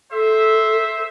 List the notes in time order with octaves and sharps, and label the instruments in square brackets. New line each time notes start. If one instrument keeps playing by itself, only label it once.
[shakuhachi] A4 [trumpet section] C5 E5